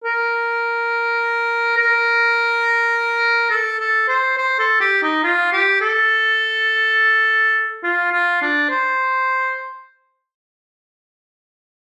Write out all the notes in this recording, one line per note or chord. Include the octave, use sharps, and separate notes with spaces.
A#4
A#4
A4
A4
C5
C5
A4
G4
D#4
F4
G4
A4
F4
F4
D4
C5